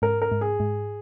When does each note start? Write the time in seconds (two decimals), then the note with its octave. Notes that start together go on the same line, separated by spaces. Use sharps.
0.02 G#2 A#4
0.22 A#4
0.32 G#2
0.41 G#4
0.60 G#2